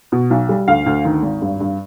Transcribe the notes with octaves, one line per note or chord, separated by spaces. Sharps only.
B2
B1
G3
D2 F5
D2
D#3
G#1
G2
G2